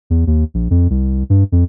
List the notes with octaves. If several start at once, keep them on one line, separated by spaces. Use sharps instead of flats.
E2
D#2
A#1
F2
C2
G2
F2